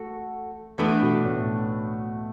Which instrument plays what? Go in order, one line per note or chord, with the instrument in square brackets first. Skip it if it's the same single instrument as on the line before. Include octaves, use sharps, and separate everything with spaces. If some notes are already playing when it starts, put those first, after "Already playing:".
Already playing: [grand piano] A3 [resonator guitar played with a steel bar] F#4 A4
[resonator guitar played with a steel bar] E3 B3 D4 [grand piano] A3
[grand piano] B2
A2